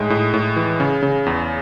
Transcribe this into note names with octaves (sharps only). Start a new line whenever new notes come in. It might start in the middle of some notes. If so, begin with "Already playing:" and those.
Already playing: A2 G#3 D#4
A2
A2
E3
C#3
C#3
E2